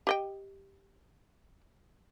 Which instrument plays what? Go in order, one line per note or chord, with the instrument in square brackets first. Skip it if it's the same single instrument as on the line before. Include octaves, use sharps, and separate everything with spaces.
[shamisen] G4 D#5 G5